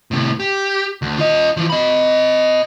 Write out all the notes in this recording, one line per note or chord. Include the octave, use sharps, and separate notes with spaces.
A2 C3
G4
D2
F4 D#5
E3 F3
D#5 B5